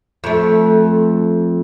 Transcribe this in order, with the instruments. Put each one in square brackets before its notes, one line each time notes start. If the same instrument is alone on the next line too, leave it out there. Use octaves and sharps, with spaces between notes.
[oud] F2 A3